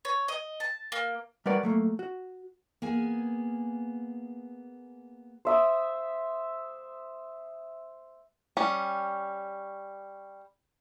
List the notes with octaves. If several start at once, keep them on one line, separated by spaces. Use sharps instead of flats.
C#5
D#5
A5
A#3
G3 A#4 B4 C#5 D5 F#5
F#3 A3 A#3
F#4
A#3 B3 G#4 G#5
C5 E5 D#6
G3 C#4